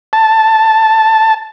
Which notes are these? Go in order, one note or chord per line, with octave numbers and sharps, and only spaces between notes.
A5